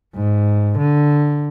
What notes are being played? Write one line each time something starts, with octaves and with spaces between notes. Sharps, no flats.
G#2
D3